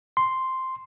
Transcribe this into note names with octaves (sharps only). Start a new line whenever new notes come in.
C6